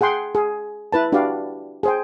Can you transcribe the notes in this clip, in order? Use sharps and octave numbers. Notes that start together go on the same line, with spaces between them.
G#4 F#5 G5 C6
G#4
E4 B4 A5
D4 F#4 G4 B4 D5 F5
G#4 C5 G5